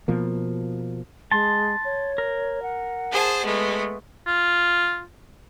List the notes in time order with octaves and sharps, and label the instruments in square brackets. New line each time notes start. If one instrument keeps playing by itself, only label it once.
[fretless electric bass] B2 F3 A#3
[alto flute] G#3 [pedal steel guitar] A5 C6
[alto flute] C#5
[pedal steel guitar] A#4
[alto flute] F#5
[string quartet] G#4 C5 A5
G#3 A3 B3
[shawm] F4